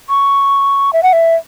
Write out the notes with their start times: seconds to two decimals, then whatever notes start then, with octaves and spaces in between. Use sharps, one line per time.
0.09 C#6
0.93 E5
1.03 F#5
1.13 E5